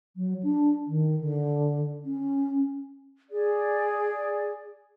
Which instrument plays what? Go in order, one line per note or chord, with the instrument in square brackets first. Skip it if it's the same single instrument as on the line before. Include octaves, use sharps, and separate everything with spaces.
[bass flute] F#3
D4
D#3
D3
C#4
[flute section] G#4 D5